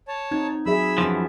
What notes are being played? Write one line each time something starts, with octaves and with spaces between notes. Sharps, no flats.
C#5 A5
C4 D#4 G#6
F#3 G#4 E5 B5 E6
F#2 E3 F3 B3 F4